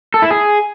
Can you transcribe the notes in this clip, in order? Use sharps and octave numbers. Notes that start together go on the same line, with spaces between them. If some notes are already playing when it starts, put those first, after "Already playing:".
A4
E4
G#4